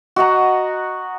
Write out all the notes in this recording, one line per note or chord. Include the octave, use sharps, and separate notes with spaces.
F#4 D#5 F#5 A#5